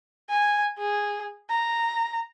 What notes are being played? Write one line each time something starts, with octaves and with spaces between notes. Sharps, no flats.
G#5
G#4
A#5